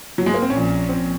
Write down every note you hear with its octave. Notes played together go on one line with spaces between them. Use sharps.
F#3
G#3
A#3
C4
A#1 A#2 F3 C#4
C4